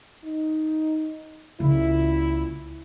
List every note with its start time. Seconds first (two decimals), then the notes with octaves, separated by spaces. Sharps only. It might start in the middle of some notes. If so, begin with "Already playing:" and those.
0.24 D#4
1.60 C#2 F#2 A#2 C#3 E4